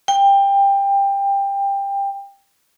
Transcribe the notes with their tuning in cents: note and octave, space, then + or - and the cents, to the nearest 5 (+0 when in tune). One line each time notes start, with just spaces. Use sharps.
G5 +20